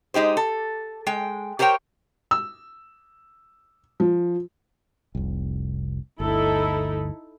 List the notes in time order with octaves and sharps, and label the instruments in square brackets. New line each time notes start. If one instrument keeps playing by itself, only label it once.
[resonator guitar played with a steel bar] G#3 D#4 G4 C5
A4
G#3 G5
G4 A#4 C5 C#5 G5
[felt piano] E6
F3
[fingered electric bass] F1 C2
[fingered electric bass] G1 D2 [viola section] D#4 E4 A4